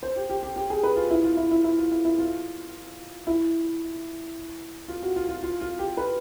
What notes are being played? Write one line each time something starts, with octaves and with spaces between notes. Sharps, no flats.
C5
G4
G4
G4
G4
G#4
B4
F4
E4
F4
E4
E4
E4
F4
E4
E4
F4
E4
F4
F#4
F4
F4
F4
F4
G4
B4